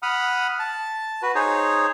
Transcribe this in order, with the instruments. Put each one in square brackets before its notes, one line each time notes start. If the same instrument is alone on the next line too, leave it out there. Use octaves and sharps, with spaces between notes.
[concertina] F#5 B5 D#6 F6
A5
F#4 B4
D#4 G#4 C5 C#5